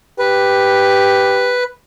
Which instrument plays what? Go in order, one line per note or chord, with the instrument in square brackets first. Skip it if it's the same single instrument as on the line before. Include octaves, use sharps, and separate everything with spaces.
[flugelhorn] G4 [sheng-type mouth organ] B4